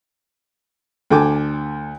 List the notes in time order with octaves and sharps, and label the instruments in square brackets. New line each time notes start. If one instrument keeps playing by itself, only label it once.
[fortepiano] D2 D3 A4 G5 G#5 D6